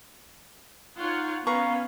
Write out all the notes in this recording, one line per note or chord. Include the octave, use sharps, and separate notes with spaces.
D#4 F4 C#5 F#5
B3 C#4 B4 F5 A#5 C#6